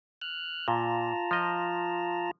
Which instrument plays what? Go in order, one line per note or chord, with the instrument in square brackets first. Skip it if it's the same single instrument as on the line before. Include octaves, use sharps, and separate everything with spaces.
[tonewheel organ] F6 F#6
[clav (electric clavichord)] A#2 [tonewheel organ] F4 A5 A#5
[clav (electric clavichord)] F3 D#5